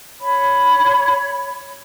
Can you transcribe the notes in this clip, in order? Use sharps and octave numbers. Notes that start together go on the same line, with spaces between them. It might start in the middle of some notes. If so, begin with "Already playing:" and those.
C#5 B5